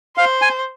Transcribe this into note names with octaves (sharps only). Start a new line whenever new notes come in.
C5 F5
G#5